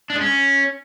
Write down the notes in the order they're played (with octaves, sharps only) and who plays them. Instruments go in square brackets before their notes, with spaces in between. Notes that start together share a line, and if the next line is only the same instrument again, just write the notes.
[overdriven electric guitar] D4
G#3
C#4